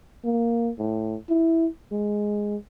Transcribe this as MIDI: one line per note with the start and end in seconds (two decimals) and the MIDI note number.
0.25 0.70 58
0.78 1.16 45
1.29 1.67 64
1.92 2.56 56